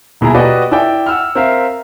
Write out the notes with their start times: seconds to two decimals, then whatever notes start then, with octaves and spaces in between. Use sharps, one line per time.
0.21 D#1 B2 E4 G#4 A#5
0.35 F#4 G4 B4 D5 D#5 F#5
0.71 E4 D5 G5
1.06 F#5 E6 F6
1.35 C4 A#4 E5 F5